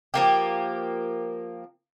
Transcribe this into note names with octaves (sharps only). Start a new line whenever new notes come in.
F3 A#3 G4